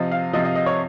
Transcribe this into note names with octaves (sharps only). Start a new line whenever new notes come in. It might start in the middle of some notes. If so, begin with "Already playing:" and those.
Already playing: C3 F3 D#5
F5
C3 F3 D#5
D#5
D#5
C#5